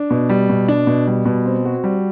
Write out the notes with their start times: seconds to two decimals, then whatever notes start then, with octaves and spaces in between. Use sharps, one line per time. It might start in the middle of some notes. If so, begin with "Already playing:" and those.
Already playing: D4
0.10 B2
0.29 G3
0.49 B2
0.68 D4
0.87 B2
1.07 G3
1.25 B2
1.46 C4
1.65 F#4
1.84 G3